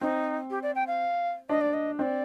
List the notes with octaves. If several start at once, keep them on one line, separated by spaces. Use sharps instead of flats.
C4 D#4
G4
D5
G5
F5
D4 D#5
D5
D#5
C4 D5 D#5